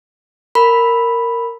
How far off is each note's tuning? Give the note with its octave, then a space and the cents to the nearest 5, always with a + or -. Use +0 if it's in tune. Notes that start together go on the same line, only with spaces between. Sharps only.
A#4 -10 B5 +0